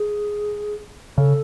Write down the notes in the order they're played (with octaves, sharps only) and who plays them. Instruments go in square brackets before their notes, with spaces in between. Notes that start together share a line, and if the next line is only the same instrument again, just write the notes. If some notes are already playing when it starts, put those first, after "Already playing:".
Already playing: [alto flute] G#4
[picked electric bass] C#3 [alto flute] A4